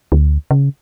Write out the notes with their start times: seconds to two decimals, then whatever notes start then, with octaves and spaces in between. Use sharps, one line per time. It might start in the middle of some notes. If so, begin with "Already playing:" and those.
0.12 D2
0.51 C#3